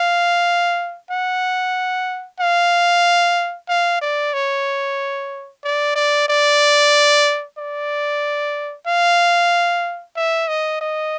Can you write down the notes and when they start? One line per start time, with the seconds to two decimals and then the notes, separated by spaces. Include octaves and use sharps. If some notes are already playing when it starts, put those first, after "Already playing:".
Already playing: F5
1.11 F#5
2.40 F5
3.69 F5
4.02 D5
4.34 C#5
5.64 D5
5.96 D5
6.29 D5
7.58 D5
8.87 F5
10.17 E5
10.48 D#5
10.81 D#5